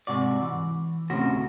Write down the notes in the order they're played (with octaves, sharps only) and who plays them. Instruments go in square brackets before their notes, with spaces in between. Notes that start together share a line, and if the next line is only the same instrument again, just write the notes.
[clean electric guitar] G#2 C3 F#4 D5
E3
D2 A2 C3 C#4 F#4